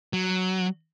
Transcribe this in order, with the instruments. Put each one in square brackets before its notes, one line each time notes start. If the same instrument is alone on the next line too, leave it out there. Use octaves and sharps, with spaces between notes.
[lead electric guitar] F#3